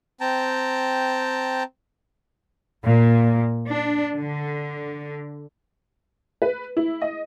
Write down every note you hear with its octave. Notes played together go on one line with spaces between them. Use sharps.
C4 G5 A5 A#5
A#2
D4
D3
B4
E4
D#5